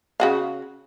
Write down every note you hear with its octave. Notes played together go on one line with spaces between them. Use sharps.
C#3 F#4 F5